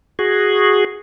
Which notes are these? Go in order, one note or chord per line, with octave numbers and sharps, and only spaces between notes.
F#4 G#4